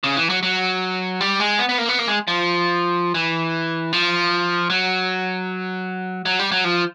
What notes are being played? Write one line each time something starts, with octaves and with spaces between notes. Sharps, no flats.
C#3
E3
F#3
F#3
G3
G#3
B3
B3
A#3
B3
A#3
G#3
F3
E3
F3
F#3
F#3
G3
F#3
F3